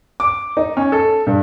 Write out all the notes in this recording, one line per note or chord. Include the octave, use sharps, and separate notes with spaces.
D6
D#4
C#4
A4
G2